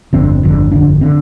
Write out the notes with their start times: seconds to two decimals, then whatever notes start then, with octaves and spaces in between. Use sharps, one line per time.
0.13 G1 F2 D3 C4
0.43 G1 F2 D3
0.71 G1 F2 D3 D4
1.01 D3 C4